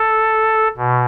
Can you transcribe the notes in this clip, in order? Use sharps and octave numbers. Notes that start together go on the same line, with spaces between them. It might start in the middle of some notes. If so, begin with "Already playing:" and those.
Already playing: A4
B2